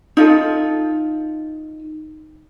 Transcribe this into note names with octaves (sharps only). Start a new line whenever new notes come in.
D#4 F4 A4